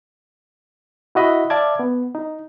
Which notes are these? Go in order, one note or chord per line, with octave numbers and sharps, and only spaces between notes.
E4 F#4 D#5 E5 B5
D5 E5 F5 A5 D6 G#6
B3
D#4